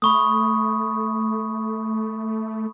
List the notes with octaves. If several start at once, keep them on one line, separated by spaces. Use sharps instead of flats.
A3 B5 C#6 D#6